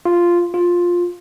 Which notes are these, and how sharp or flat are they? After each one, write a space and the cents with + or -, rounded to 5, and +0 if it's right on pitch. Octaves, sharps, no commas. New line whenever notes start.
F4 -5
F4 +10